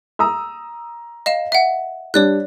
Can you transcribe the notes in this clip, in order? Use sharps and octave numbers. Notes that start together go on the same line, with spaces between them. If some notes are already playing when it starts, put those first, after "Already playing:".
A#5 D#6 E6
D#5 F5 E7
E5 F#5
G3 D4 C#5 D5 F#6